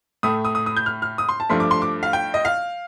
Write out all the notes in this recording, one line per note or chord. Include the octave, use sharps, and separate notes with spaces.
A2 A3 D#6
D#6
D#6
D#6
G6
F6
F6
D#6
C6
A5
G2 F3 A3 C6
D6
C6
D6
F5
G5
D#5
F5